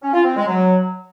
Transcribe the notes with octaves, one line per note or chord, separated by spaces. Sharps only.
C#4
F4
C4
G#3
F#3